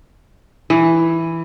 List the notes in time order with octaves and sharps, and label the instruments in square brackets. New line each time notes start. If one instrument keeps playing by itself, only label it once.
[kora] E3